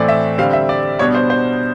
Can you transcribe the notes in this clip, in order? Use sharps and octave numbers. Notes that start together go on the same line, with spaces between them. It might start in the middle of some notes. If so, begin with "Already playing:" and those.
Already playing: A2 E3 A3 C4 D5
E5
D3 G3 C4 F5
E5
D5
B2 G3 B3 D4 C#5
C5
C5